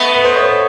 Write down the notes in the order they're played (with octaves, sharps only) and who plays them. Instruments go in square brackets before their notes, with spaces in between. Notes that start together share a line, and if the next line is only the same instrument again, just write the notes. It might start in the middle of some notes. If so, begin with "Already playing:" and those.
Already playing: [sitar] A3 B3 [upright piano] D#5
[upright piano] B4
C5
C#5